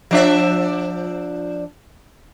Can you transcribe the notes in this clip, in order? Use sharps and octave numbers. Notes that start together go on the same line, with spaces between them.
F3 D4 E5